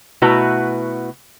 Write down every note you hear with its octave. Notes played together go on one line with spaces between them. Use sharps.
B2 A3 E4 F#4 B4 A#5